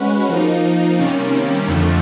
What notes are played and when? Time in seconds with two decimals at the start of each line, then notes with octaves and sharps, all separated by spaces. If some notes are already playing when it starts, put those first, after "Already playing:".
Already playing: G#3 C#4 F#4 B4
0.29 F3 A#3 D#4
0.99 C3 D#3 G3 A#3 C#4
1.68 F2 D3 F3 A3